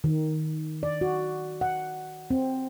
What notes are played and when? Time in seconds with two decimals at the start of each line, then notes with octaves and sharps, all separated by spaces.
0.04 D#3
0.83 D5
1.01 F#4
1.61 F#5
2.30 C4